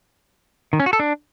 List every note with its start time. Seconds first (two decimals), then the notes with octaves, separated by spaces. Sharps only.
0.73 D#3
0.80 C#4
0.86 F#4
0.93 A4
1.00 D4